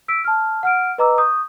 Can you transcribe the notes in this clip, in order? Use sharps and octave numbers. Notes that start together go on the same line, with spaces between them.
E6 B6 D7
A5 F6
F#5 F6 D7
B4 D#5 A#5 D6 E6
C#6 D#6 G6